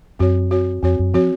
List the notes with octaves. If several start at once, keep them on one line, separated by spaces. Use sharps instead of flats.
F#2 C4 F#4 C#5
C4 F#4 C#5
F2 C4 F#4 C#5
F#2
F3 C4 F#4 C#5